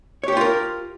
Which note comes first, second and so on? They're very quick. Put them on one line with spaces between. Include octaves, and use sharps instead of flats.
C#5 G4 C5 F4 A#4